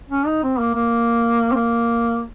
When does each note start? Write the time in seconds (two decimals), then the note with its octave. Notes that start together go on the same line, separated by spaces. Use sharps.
0.10 C#4
0.27 D#4
0.44 C4
0.59 A#3
0.75 A#3
1.52 C4
1.56 A#3